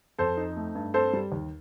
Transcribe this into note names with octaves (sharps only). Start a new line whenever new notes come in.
F2 A4 C5
D#4
A3
G2
C4 A4 C5
G3
D#2